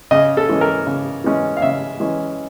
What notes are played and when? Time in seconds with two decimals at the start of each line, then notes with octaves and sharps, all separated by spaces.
0.11 C#3 D#5
0.37 A4
0.49 E3 G#3 C#4
0.61 A#4
0.87 C#3
1.24 E3 G#3 C#4
1.57 F5
1.62 C#3 E5
2.00 E3 G#3 C#4